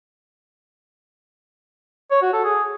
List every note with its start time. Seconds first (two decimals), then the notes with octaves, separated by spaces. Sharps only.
2.11 C#5
2.22 F#4
2.33 A4
2.44 G#4